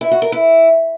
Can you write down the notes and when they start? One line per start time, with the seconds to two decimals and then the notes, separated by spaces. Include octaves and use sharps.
0.01 E4
0.11 F#4
0.22 A#4
0.32 E4